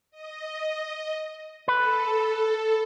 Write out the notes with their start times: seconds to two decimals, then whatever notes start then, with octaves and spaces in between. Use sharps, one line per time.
0.11 D#5
1.68 A4 B4